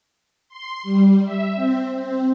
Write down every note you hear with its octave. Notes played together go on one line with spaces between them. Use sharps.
C6
G3
E5
C4
C4